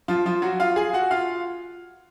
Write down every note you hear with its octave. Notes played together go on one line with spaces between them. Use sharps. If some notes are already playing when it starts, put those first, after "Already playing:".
F3 F4
F3 F4
F#3 F#4
F4 F5
G#4 G#5
F#4 F#5
F4 F5